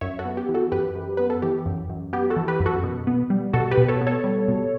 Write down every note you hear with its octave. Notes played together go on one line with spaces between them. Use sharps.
F#2 C#5 E5
F#4 A4
B3
G4
E3
F#4 A4
F#2 G4 B4
F#2
B3 B4
A4
E3 G4
F#2
F#2
B3 G4
F#4 A4
E3
G4 B4
F#2
F#4 A4
B2
B3
G3
B2 F#4 A4
G4 B4
B2
A4 C#5
B3
A4 C#5
G3
B2